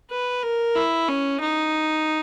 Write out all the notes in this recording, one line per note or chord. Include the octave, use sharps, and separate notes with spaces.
B4
A#4
E4
C#4
D#4